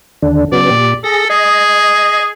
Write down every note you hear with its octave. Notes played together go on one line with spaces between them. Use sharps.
D#2 D3 D4
C#3 F#3 B3 D5
A#2 G4
G#4 A4 A#6
G#4 D#5